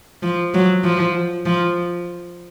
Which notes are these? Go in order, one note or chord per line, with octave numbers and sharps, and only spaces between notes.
F3
F#3
F3
F3